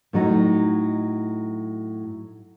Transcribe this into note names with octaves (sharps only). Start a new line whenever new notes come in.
A2 F#3 D#4